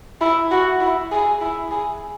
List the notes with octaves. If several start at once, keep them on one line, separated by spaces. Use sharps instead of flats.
E4
F#4
E4
G#4
E4
G#4